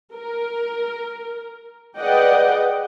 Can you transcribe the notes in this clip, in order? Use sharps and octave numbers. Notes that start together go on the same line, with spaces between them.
A#4
G#4 B4 D5 D#5 F#5 G5